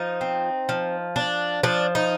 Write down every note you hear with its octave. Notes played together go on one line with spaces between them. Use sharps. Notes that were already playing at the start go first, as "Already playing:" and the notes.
Already playing: F3 D#4
C4
F3
D4
F3 D4
D#4